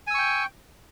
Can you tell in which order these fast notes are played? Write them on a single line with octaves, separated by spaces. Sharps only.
G#5 E6 C#6 G5